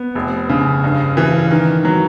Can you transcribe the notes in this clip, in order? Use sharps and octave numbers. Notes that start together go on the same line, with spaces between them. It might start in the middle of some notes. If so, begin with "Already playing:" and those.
Already playing: B3
F1
C#3
G2
E3
D#3
F#3